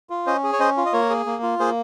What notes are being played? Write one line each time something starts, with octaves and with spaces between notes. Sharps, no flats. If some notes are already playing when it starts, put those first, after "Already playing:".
F4
C#4 C5 D#5
G#4
C#5
C#4 C5 D#5
F4
D#5
A#3 A#4 C#5
G#4
A#3
F4
A#3 G#4 C5